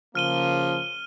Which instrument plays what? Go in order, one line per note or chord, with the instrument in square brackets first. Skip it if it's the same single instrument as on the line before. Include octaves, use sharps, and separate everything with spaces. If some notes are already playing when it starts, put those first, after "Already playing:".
[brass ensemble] C#3 A#3 [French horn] F3 [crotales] F6 D#7 G7